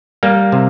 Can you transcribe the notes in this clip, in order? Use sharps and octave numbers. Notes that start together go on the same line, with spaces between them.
G3 A#3
C3